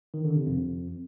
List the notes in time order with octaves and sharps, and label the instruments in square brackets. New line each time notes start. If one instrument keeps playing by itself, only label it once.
[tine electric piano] D#3
D3
C3
F2